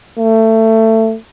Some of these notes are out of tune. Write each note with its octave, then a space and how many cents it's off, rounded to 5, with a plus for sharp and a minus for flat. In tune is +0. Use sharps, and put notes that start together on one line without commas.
A3 +20